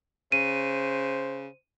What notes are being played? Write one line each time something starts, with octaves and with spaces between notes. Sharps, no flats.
C#3 C5 D#7